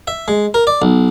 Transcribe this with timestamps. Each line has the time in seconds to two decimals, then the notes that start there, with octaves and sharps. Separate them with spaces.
0.07 E5
0.28 G#3
0.54 A#4
0.67 D5
0.82 B1